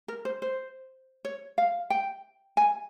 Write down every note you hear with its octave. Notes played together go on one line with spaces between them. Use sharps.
A#4
C5
C5
C#5
F5
G5
G#5